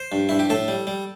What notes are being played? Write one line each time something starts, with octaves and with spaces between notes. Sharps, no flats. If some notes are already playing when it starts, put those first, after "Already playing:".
Already playing: C5
G2
G2 E4
G4
A2 A4
G3
G3